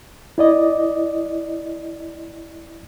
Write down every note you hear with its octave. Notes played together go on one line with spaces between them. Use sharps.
E4 D5 D#5